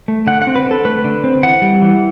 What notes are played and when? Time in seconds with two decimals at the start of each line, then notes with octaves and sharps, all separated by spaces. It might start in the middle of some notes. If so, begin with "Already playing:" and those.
0.08 A3
0.27 D3 F#5
0.42 F#5
0.47 C4
0.56 B4
0.66 D3 A4
0.85 A3 B4
1.04 D3
1.24 C4
1.43 E3 F#5
1.62 G3
1.82 E3